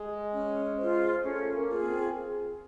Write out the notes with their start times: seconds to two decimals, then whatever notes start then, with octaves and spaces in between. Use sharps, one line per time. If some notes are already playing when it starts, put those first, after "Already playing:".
Already playing: G#3
0.31 C#4
0.78 F4 G#4 C5
1.23 A3 C#4
1.54 A#3
1.69 F4 G#4
1.83 C4